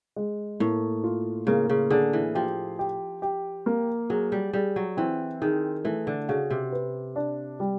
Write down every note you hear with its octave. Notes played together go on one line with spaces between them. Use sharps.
G#3
A2 A#3
F4
C#3 A#3
C#3
D3 G#4
E3
F3 G4
G4
G4
A#3
F#3 G#4
G3
G3 G#4
F#3
E3 C4
D#3 G#4
E3 A3
D3
C#3 F#4
C3
B4
D4
G3